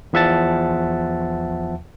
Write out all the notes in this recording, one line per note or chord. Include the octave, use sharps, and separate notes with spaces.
E2 F3 E5 F#5 A5 A6